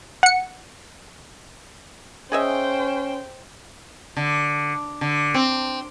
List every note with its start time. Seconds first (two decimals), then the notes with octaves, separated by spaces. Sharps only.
0.23 F#5 C#7
2.32 C#4 G#4 C5 D#5 E5 G5
4.17 D3
5.01 D3
5.34 C4